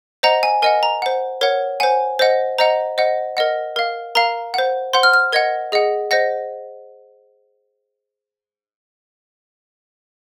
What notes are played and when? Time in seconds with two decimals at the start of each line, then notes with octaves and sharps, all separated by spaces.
0.23 C5 D#5 F#5 A#5
0.43 G#5
0.62 A#4 D#5 F#5 G#5
0.83 A#5
1.02 C5 F#5
1.41 A#4 C#5 F#5
1.80 C5 F#5 G#5
2.19 C5 D#5 F#5
2.58 C5 D#5 F#5 A#5
2.98 C5 D#5 F#5
3.37 A#4 D#5 F#5
3.76 A#4 F5
4.15 A#4 F5 A#5
4.54 C5 F#5
4.93 C5 F#5 C6
5.03 F6
5.13 F6
5.32 A#4 D#5 F#5 G#6
5.72 G#4 D#5 F#5
6.11 C5 D#5 F#5 A#6